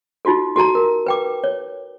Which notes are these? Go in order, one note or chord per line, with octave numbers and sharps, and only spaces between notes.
D#4 F4 F#4 A4
F#4 A4 A5 A#5
A#4
B4 G5 D6
C#5